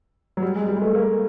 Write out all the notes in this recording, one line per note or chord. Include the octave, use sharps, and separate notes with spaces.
F#3
G3
G#3
G3
G#3
A3
A#3